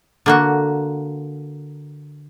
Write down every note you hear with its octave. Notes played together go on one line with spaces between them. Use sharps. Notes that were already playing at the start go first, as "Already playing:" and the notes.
D3 A#3 F#4